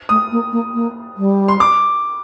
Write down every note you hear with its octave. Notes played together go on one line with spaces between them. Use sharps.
A3 D#6
A#3
A#3
A#3
G3
C6
D6